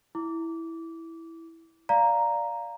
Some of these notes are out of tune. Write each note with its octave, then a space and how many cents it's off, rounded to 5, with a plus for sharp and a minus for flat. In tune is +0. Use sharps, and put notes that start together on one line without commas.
E4 +0 D6 -20
D5 +0 F5 +0 A#5 +0